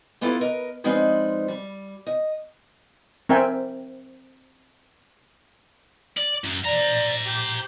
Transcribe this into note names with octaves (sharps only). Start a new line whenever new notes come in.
A#3 B3 E4 F4 G4 A4
A#4 B4 D#5
F3 G#3 C4 D4 D#4 B4
G3
D#5
C4 A#4 E5 G5 G#5
D5
F#2
C5 D5 A#5
G4